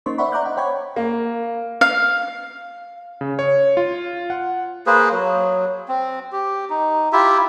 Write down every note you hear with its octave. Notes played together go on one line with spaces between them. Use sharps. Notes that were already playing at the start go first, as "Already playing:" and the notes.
A#3 C#4 D#4 C5 C6 C#6
C5 D5 E5 F#5 B5 C#6
D5 A#5 D6 F#6 G6
D#5 F#5
C5 C#5 G5 B5 C#6 G#6
A#3
F5
C#3
C#5
F4
F#5
A#3 G#4 B4 C5
F#3
C4
G4
D#4
E4 F4 G4 E5